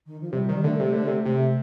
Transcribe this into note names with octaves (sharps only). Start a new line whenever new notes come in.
D#3
F3
C3 G3
D#3
G3
D3 A3
C3
D3 A3
C3
C3 A3